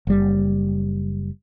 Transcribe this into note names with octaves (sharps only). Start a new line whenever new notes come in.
F#1 G3